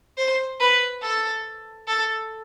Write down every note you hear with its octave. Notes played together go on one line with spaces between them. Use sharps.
C5
B4
A4
A4